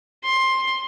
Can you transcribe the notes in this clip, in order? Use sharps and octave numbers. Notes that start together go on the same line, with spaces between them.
C6